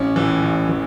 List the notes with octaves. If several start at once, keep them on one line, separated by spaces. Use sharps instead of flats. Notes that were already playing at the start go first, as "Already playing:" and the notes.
Already playing: A1 C#4
A2 E3
A1
A2 E3